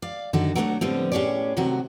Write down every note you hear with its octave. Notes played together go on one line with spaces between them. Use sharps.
D5 F5
F#2 D3 D#3 F#4 A4
F#3 A3 B3 C#4 D4 F#4
A2 D3 F3 G3 B3 C4
A2 C#4 G4 G#4 C#5 D5
C3 D#3 F#3 A3 F#4